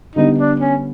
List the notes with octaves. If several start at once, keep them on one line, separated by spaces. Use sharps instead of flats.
D3 G3 B3 D#4
D4
C#4